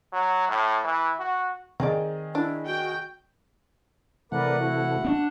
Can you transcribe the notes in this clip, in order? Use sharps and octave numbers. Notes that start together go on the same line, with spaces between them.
F#3
A2
E3
F#4
D#3 C4 G#4 D5 D#5
D4 E4
F#4 G5
C3 E3 A3 A#4 B4 D5 F#5
E4 F#4
C4 D4